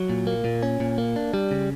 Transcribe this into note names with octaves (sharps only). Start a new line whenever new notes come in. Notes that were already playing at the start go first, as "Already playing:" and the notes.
Already playing: F#3
A#2
A#3
A#2
C#4
A#2
A#3
D4
G3
C#3